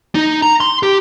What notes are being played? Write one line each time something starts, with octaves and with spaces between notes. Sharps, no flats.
D#4
A#5
C6
G4